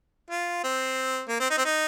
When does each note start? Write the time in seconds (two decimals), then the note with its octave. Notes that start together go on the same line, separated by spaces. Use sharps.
0.30 F4
0.64 C4
1.28 A#3
1.40 C4
1.50 D#4
1.57 C4
1.65 D#4